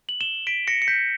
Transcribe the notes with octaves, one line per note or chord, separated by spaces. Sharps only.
F#7
E7 G7
B6 D7
A#6 C#7
C#7
G6 B6